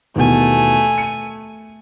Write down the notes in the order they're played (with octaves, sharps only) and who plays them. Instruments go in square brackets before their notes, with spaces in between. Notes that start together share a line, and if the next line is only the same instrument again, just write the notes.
[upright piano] D#2 B2 E3 [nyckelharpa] A3 G#5
[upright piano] C#7 D#7